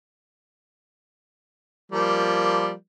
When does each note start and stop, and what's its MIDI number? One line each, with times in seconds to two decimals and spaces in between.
1.92 2.72 53
1.92 2.72 55
1.92 2.72 58